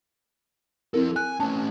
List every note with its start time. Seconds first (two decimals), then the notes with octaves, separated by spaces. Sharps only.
0.94 F3 C4 E4 A4 A#4
1.16 G#5 F#6
1.40 A3 C#4 A5